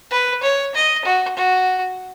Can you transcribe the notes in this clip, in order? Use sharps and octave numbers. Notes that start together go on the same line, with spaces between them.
B4
C#5
D#5
F#4
F#4